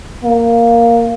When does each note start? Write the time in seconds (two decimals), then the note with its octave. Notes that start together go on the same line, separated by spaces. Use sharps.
0.24 A#3